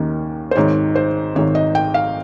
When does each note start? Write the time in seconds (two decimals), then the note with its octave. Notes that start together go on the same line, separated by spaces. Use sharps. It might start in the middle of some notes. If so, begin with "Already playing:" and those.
Already playing: D#2 D#3 A#3 C#4
0.51 C5
0.56 G#1 G#2 D#3 C#5
0.95 C5
1.35 G#1 G#2 D#3 C#5
1.55 D#5
1.75 G5
1.94 F5